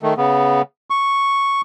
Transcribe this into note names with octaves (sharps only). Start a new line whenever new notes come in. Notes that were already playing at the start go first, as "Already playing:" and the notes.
D#3 A3
C#3 B3
C#6